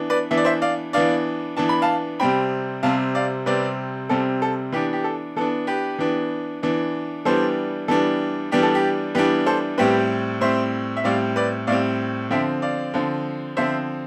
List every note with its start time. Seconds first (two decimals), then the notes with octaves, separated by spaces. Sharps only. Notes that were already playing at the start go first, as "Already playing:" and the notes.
Already playing: E3 B3 D4
0.10 B4 D5
0.31 E3 B3 D4 E5
0.37 D5
0.45 C5 E5
0.62 D5 F5
0.93 E3 B3 D4 D5 F5
1.57 E3 B3 D4 A5
1.69 B5
1.82 F5 A5
2.20 C3 G3 C4 G5 B5
2.83 C3 G3 C4 F5 A5
3.15 D5 F5
3.46 C3 G3 C4 B4 D5
4.09 C3 G3 C4 A4
4.42 A4
4.72 E3 B3 D4 G4 B4
4.93 G4
5.04 A4
5.36 E3 B3 D4 A4
5.67 G4 B4
5.99 E3 B3 D4
6.63 E3 B3 D4
7.25 E3 G3 B3 D4 A4 C5
7.88 E3 G3 B3 D4 A4
8.52 E3 G3 B3 D4 G4
8.63 A4
8.75 G4
9.15 E3 G3 B3 D4 G4 B4
9.46 A4 C5
9.78 A2 G3 C4 G4 B4
10.41 A2 G3 C4 C5 E5
10.97 E5
11.04 A2 G3 C4 D5 F5
11.36 B4 D5
11.67 A2 G3 C4 D5 F5
12.31 D3 F3 C4 E5 G5
12.62 D5 F5
12.94 D3 F3 C4
13.57 D3 F3 C4 C5 E5